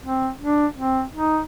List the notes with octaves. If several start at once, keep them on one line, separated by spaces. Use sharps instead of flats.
C4
D4
C4
D#4